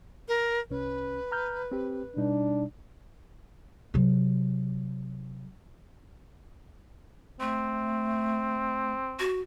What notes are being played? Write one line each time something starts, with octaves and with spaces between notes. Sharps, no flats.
A#4
C2 C#4 B4
A#5 F6 G6
C4 G4
B2 G3 D4 D#4
C3 F#3
A3 C4
F#4